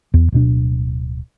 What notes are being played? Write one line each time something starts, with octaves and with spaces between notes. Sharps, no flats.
E2
D1 B2 D4